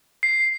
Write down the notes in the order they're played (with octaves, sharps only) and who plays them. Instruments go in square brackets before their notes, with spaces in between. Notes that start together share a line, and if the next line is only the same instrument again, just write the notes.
[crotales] C7